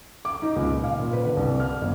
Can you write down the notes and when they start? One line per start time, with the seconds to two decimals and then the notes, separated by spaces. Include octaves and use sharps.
0.25 D6
0.42 D#4
0.56 C#2
0.70 A#2
0.84 F5
0.99 A#2
1.13 B4
1.25 D3
1.37 C2
1.60 F6
1.81 G1